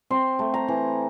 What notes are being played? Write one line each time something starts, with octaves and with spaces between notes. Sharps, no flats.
C4 C6
A3
A#5
E3